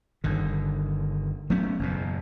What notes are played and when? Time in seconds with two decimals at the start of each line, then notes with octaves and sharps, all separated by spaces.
0.24 G1 D3 D#3
1.50 F#3 A3 B3 C#4
1.79 F#1 E2 B2